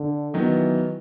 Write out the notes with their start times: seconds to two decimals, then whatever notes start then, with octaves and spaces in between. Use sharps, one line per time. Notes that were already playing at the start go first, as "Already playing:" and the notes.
Already playing: D3
0.34 D#3 E3 F#3 B3